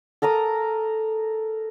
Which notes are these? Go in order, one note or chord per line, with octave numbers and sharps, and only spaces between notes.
A4 A#4 A#5 D#6